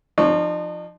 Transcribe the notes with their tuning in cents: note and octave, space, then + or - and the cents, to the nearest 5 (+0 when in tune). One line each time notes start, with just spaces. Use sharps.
F3 +0 D#4 -45 C#5 +5